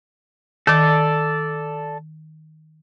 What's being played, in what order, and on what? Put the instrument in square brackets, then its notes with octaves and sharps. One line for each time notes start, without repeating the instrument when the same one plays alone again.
[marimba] D#3 [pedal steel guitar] A4 D5